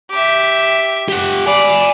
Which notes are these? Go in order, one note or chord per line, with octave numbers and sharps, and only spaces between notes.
G4 E5
G4 F#5
D5 G#5 B5